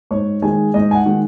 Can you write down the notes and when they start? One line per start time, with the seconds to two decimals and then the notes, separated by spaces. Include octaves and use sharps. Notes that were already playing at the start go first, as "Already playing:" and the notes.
0.11 G#2 C#5 C#6
0.42 D#3 G#3 G#4 G#5
0.74 G#2 D#5
0.91 G#5
0.95 F#5
1.06 D#3 G#3